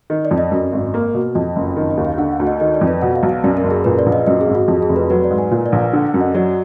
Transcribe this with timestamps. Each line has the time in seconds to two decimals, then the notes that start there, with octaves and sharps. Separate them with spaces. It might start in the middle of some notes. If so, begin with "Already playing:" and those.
0.10 D#3
0.25 D5
0.31 F2
0.38 D#5
0.51 F#2
0.72 G#1
0.94 A#3
1.15 B2
1.35 F2 D#5
1.56 F#1
1.77 D#3
1.90 D#5
1.97 D#2
2.05 F5
2.18 D3 F#5
2.32 F#5
2.39 D2
2.47 D#5
2.60 D#3 D#5
2.74 D5
2.81 F2
2.88 B4
3.01 B2 F#5
3.16 F5
3.23 B1
3.29 F5
3.44 F#2 D5
3.57 A#4
3.64 F#1
3.71 G#4
3.84 A#2 B4
3.99 D5
4.06 A#1
4.12 D#5
4.27 F#2 D#5
4.41 G#4
4.47 G#1
4.55 F#4
4.68 F2 F#4
4.82 G#4
4.89 F1
4.96 B4
5.10 F#3 B4
5.24 D5
5.30 G#2
5.38 G#5
5.51 A#2 A#4
5.66 D5
5.72 A#1
5.79 D5
5.93 D3
6.07 F#5
6.14 F#2
6.20 D#5
6.35 F#3 D5